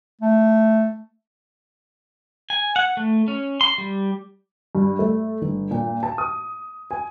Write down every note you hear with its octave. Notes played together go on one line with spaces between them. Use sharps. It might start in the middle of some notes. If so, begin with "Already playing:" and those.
A3
G#5
F#5
A3
C#4
C6
G3
G2
A3
G1
A#2
A5
D#6
G#5